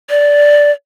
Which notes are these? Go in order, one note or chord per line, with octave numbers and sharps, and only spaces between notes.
D5